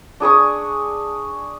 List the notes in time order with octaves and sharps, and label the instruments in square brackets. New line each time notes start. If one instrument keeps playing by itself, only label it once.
[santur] D4 G#4 C#6 D#6